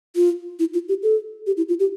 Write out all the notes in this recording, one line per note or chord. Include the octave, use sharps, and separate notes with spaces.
F4
E4
F4
G4
A4
G4
E4
F4
G4